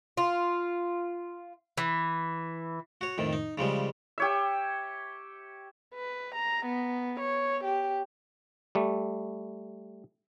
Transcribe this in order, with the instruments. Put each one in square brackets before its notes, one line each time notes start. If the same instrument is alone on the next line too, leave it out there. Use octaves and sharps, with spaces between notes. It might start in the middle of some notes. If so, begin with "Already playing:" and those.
[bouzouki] F4
E3
[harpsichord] F#4 C#5
F2 A2 D#3
D#4
C#3 F3 G3 G#3
[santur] G4 C#5 E5
[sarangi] B4
A#5
B3
C#5
G4
[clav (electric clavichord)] G3 A3